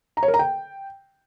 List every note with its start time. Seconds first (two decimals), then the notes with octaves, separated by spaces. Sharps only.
0.17 A#5
0.23 C#5
0.28 A#4
0.34 A#5
0.39 G5